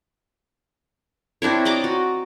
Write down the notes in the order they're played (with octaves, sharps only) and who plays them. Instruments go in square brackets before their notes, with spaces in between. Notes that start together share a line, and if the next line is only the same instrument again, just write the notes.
[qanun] C4 D4 E4 C#5
D5 D#5 A#5 D6
F#4